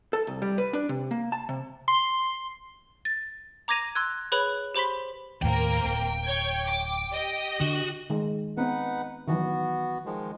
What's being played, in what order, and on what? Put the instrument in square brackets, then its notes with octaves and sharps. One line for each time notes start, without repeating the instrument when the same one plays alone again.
[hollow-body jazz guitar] A4
C2
G3
B4
D4
C3
A#3
A5
C3
[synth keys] C6
[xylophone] A6
A#5 D6 G#6 A#6 D#7 F7
C6 E6 F#6 G#6
G#4 B4 C#5 B5 F#6 F7
G4 C5 B5 C6 B6
[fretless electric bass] D#2 A2 [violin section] A#3 C4 A#4 [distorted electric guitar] G5
[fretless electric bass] D1
[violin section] C#5 G6 G#6
D6
G4 D#5
[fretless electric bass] D3 [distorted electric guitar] F#4
[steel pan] D#3 G#3
[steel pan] B3 C4 [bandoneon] D#4 B4 F#5
[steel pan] D#3 E3 F#3 [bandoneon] B3 F#4
[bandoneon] D#3 F3 G#3